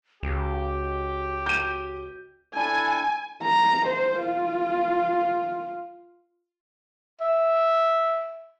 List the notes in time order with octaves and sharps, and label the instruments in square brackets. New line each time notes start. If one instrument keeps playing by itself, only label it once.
[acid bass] C#2 [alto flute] F#4 [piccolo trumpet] G4
[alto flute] F#4 [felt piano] G6 D#7
[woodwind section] D4 E4 A4 [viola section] G#5
[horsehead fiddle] A#5
C5
F4
[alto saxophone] E5